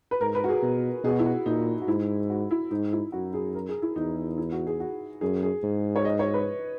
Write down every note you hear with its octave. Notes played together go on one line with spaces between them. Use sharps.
B4
G#2 A#4
B4
F#4
G#4
B2
B2 G#4
F#4
E4
F#4
A#2 D#4
F#4
G#2 E4
F#4
E4
G#2 D#4
E4
F#2 F#4
G#4
A#4
G#4
E4
E2 D#4
E4
F#4
G#4
F#4
F#2 G#4
G#4
G#2
C#5
D#5
C#5
B4